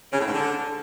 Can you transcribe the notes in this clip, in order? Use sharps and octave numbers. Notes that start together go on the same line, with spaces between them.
C#3
A2
G#2
D3